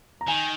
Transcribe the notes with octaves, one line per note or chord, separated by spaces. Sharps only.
A#5
D#3 G#5